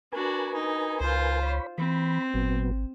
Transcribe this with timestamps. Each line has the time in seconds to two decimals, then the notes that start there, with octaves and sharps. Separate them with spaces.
0.13 D4 F#4 A#4 B4 G#5
0.53 D#4
1.00 C#2 F4 C5
1.42 C#5 B5
1.78 E3 C4 B5
2.34 G#1 A#2 F#3 B3